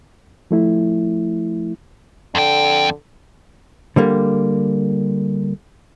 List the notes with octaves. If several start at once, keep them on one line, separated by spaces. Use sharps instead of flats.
F3 A3 E4
F2 D3 G5
D3 G3 A#3